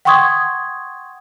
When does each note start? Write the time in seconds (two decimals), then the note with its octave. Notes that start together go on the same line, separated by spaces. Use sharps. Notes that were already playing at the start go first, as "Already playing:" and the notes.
0.05 F#5 G5 C6 C#6 D#6 G#6